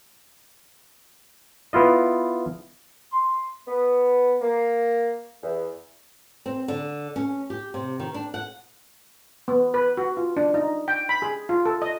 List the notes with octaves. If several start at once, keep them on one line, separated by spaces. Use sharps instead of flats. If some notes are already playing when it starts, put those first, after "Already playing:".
B3 E4 F4 D#5
C6
B3
A#3
E2
C4
D3
C#4
G4
C3
D#3
D4
F#5
B3
B4
F#4
F4
D4
D#4
G5
B5
G#4
F4
A4
D#5